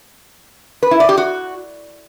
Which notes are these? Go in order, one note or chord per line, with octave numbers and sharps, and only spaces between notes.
B4
E4
D5
G4
F#4